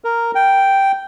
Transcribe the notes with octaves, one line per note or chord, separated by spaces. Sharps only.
A#4
G5